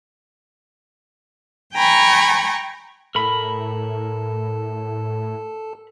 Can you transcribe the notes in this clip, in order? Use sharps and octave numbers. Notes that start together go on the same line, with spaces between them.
G5 G#5 A#5 B5 C#6
A2 A4 A#4 A5 B5